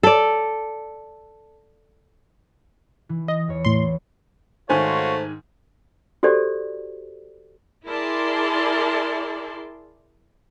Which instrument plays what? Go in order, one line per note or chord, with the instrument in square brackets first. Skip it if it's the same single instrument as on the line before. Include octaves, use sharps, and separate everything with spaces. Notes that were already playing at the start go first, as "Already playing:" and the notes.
[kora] A4 D5
[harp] E3
[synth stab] D#5
[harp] E2 C#5
[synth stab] A2 C6
[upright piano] G#2 D#3 G#5 [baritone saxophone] A3 [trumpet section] F4 F#4 C#5 [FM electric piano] C5
[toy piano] F#4 G4 A4 C5 D5
[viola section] E4 G#4 A#4 D5 A5 C6